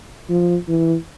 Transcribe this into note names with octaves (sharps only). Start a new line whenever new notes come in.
F3
E3